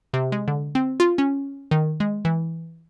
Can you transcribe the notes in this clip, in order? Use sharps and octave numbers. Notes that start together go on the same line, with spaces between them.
C3
G#3
D3
C4
F4
C#4
D#3
G#3
E3